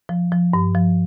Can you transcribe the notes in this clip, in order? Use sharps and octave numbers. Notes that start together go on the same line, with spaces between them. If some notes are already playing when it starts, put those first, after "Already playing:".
F3
F3
G2
F3